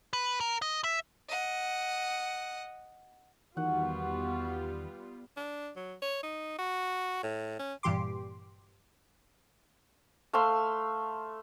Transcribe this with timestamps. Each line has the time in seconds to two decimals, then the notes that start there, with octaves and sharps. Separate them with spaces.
0.13 B4
0.40 A#4
0.62 D#5
0.84 E5
1.29 D#5 F#5
3.57 E2 D#3 G3 B3 F4 F#4 F#5
5.37 D4
5.76 F#3
6.02 C#5
6.23 D#4
6.59 F#4
7.23 A2
7.59 C#4
7.83 G2 A#2 E3 G4 C6 D6
10.33 A3 F5 C6 E6